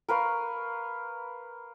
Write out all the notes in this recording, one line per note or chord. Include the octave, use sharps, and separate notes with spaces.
A#4 B4 F5 C#6